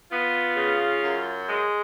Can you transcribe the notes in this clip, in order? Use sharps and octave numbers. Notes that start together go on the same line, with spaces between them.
B3 F4
C#3
F#2
G#3